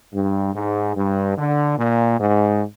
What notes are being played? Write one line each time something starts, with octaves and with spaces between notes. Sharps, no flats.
G2
G#2
G2
D3
A#2
G#2